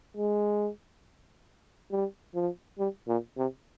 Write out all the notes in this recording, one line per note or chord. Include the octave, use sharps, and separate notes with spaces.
G#3
G3
F3
G3
A#2
C3